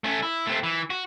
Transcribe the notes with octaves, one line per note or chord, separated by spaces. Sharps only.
A3 C#4
E4
A3 C4
E3
F#4